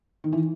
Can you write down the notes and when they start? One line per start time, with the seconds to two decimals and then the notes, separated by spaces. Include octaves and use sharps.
0.24 D#3
0.33 E3